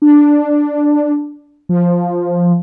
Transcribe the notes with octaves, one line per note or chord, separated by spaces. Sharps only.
D4
F3